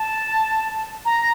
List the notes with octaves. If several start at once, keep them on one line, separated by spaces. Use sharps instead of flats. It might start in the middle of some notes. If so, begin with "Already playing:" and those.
Already playing: A5
A#5